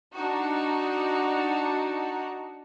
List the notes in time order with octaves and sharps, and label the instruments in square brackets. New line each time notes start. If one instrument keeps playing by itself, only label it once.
[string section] D4 D#4 F#4